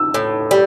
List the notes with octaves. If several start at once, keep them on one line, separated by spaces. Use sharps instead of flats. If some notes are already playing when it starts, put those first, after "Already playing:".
Already playing: E6
A2
G3